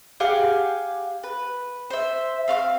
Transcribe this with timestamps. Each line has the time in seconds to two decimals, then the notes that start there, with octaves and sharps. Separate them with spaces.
0.20 G4 G#4 F5 F#5
1.23 B4
1.90 C5 E5
2.48 C4 F5 C#6 F6